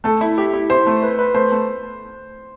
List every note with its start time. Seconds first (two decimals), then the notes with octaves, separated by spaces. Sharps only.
0.04 A3 A4
0.21 E4
0.38 G4
0.53 E4
0.70 E4 C5
0.86 A3
1.03 B4
1.19 B4
1.34 A3 C5
1.52 A3